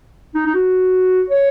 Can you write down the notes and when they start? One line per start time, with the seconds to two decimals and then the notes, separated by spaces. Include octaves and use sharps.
0.35 D#4
0.46 D#4
0.54 F#4
1.30 C#5